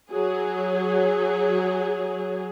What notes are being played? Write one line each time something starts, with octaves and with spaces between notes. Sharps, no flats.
F#3 G#4